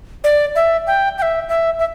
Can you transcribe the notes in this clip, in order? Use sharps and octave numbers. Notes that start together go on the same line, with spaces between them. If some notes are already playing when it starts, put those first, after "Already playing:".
D5
E5
G5
G5
E5
E5
E5